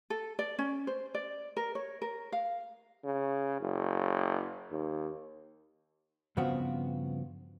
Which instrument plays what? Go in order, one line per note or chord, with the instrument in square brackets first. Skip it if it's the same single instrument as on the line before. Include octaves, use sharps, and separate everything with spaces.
[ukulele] A4
D5
C#4
C5
D5
A#4
C#5
A#4
F5
[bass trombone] C#3
F#1
D#2
[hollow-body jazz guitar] G2 C#3 F3 B3 C4 F#4